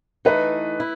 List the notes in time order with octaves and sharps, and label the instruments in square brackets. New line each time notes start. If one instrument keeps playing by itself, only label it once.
[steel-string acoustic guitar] E3 A3 D#4 [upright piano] B4
[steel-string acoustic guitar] E4